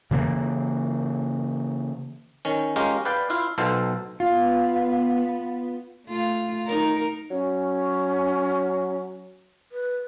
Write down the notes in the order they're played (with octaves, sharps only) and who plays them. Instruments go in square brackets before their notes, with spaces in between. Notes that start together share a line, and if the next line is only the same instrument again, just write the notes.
[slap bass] C#3 E3 A#3
[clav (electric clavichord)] D#3 C#4
G#3 C#4 F4 G4 A#4
B4 D5 F5 G5
E4 F4 F5
B1 B2 A4 C5 F5
[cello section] B3 [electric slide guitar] F4
[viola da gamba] A3 F4
D#4 A#4
[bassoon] F#3 [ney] C#4
[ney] B4